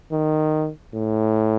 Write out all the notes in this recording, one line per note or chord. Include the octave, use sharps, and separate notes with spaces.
D#3
A2